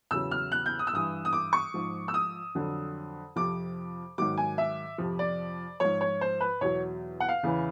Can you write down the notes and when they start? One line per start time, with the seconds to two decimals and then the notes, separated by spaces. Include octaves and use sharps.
0.11 E2 C#3 F#3 E6
0.31 F6
0.52 F#6
0.66 G6
0.79 D#6
0.87 E6
0.93 G2 E3 D#6
1.25 D#6
1.33 D6
1.53 C#6
1.74 G#2 F3
2.08 E6
2.14 D#6
2.55 F2 D3 F#3
3.36 F2 C3 F3 D6
4.18 G#2 D#3 F#3 D6
4.38 G#5
4.58 E5
4.98 F2 C3 F3
5.19 D5
5.80 G#2 F3 C#5
6.01 C#5
6.21 C5
6.40 B4
6.61 E2 B2 F#3 C#5
7.20 F#5
7.29 F5
7.43 E2 C#3 E3